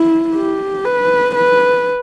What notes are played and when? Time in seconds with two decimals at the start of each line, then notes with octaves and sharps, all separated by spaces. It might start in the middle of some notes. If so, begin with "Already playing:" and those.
Already playing: E4
0.35 G4
0.85 B4
1.35 B4